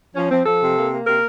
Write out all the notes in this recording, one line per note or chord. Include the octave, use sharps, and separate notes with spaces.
F3 C#4
F3 C4
F3 A4
C3
A#3
A#3
C3 A#4